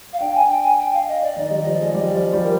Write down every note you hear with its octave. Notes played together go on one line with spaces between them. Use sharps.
F5
D4 G5
G#5
G5
G#5
G5
F5
D#5
D5
D#3 D#4 D5
D#5
G3 G4 D5
D#5
F3 F4
D5
G#3 G#4 D#5
D5
G3 G4 D#5
D5
F3 F4
G3 G4
A#4